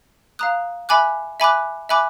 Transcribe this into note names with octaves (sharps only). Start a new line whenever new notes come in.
F5 A#5 D#6 F#6
E5 G#5 B5 D6 F#6
E5 G#5 B5 D6 F#6
E5 G#5 B5 D6 F#6